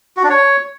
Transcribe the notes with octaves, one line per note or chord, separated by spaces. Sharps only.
F#4
D4
C#5